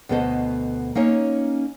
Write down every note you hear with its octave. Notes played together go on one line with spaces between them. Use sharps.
D2 B2 B3 A4 C5 D#5
A#3 C#4 D#4 C#5